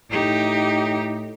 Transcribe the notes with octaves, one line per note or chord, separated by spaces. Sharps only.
A2 D#4 G4